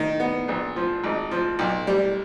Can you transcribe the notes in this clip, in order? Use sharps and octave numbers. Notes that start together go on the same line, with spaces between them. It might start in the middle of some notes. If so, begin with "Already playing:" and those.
Already playing: D#3
B3
A#1
F3
G#1
F3
B1
G3